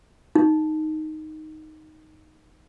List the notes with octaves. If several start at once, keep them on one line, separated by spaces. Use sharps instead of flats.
D#4